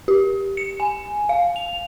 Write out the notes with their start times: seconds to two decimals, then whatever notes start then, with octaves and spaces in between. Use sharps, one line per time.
0.08 G4
0.57 C#7
0.80 G#5
1.29 F5
1.56 F7